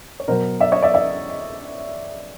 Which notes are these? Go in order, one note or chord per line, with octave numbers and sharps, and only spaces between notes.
C#5
B2 F#3 A#4 C5
D5 E5
C#5 D#5
D5 E5
D5 E5